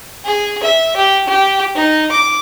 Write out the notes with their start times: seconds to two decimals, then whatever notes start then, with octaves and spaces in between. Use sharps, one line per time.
0.25 G#4
0.63 E5
0.96 G4
1.28 G4
1.75 D#4
2.11 D6